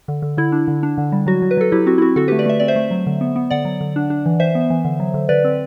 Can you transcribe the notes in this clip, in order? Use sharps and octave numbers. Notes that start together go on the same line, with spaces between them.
D3
D3
D3 E4
D4
D3
D4
D3
G3
F#3 F#4
F#3
B4
F#3 A4
F#3 E4 G4
C4 F#4
E4
C4 F#4
D3 F#4 A4
A3 G4 B4
B4 D5
A3 E5
C4 D5
C5 E5
A3
F#3
D3
B3
B3
D3 D5 F#5
F#3
D3
D4
D4
E3
E3 C5 E5
B3
E3
D3
F#3
D3
D3 B4 D5
C4